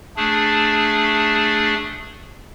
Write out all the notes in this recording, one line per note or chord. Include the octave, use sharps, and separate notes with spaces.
A3 D4 G#4